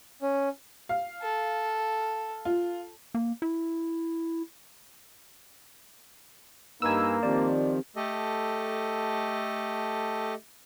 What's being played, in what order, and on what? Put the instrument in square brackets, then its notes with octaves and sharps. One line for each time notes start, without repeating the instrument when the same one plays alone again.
[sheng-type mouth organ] C#4
[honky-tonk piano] F5
[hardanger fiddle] A4
[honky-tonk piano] F4
[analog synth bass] A#3
E4
[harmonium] G2 D#4 B4 [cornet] A#3 [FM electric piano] G#5 E6
[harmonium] D#3 F3 [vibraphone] C4 G4 [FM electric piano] D5
[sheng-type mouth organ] A3 G4 A4 D#5